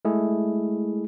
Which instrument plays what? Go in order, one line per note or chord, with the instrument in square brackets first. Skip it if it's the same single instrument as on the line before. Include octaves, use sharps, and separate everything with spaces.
[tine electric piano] G#3 A3 E4 G#4